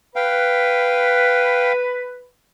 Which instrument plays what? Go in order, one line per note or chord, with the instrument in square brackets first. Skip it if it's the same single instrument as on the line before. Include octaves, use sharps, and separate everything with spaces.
[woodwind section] B4 [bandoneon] F5 G5